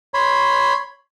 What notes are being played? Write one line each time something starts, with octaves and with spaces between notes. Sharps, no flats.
C#5 B5 C6